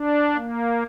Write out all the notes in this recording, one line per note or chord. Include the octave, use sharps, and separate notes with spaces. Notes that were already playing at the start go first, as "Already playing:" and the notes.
Already playing: D4
A#3